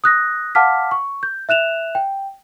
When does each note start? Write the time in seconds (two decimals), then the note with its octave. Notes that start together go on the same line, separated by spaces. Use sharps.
0.04 D#6 F#6 A#6
0.55 F5 F#5 A5 D6 F6 B6
0.91 C#6
1.23 G6
1.49 E5 F#6 E7 F7
1.95 G5